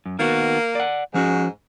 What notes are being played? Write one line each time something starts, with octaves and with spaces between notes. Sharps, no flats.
F#2
D#3 A#3 B3 F#4
D5 F#5
G#2 F3 C#4 F#4